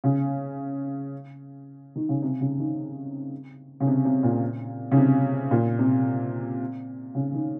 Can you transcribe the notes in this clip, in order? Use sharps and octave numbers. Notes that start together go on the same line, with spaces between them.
C#3
D#3
C#3
C3
C#3
D#3
C#3
C3
C3
A#2
C#3
C3
A#2
C3
C#3
D#3